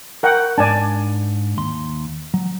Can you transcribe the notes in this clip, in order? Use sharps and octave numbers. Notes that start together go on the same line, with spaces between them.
A#4 F#5 G5
G#2 D4 D5 G#5 A5
D#2 C6
F#3